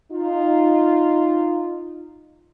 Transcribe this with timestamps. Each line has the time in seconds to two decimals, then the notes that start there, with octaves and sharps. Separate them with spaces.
0.12 D#4 F4